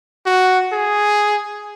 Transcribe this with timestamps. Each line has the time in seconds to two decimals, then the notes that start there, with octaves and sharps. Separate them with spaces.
0.26 F#4
0.72 G#4